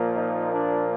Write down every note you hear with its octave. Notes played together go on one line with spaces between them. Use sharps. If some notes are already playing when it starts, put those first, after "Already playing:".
Already playing: A#2 F3 A#3
D#4
D4